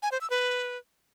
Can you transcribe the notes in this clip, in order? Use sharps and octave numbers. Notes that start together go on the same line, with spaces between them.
G#5
C5
E6
B4